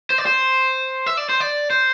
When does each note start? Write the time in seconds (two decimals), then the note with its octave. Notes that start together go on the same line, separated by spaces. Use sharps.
0.10 C5
0.18 D5
0.26 C5
1.06 E5
1.17 D5
1.29 C5
1.40 D5
1.70 C5